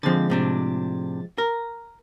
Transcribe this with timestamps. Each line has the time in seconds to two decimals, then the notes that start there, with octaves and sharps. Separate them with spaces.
0.03 D3 F3 G#3 C4 A6
0.30 A2 C3 D4
1.38 A#4